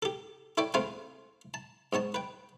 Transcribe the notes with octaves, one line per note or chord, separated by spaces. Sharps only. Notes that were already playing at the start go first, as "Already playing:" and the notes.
G4 A4
E4 A4 C#5 D5 G5
A3 C4 F4 G#4 B4 G5
A5
G#2 B3 C#5 A5
B4 G5